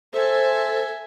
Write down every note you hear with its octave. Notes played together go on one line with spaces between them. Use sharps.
A4 C5 E5 G#5